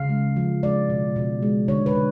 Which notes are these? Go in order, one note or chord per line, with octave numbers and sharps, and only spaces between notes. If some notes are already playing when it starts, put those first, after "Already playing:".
Already playing: C#3 F5
G#3
F3
G#3 D5
B2
B2
G#3
D3 C#5
B4
D3